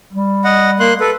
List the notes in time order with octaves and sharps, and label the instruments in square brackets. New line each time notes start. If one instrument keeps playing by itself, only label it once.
[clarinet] G3
[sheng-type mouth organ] D#5 F#5
A#3 C6 F#6
A4 B4